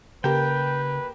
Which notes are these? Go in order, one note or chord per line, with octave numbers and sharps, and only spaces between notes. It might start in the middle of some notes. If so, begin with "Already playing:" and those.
C#3 A#3 G4 B4 G5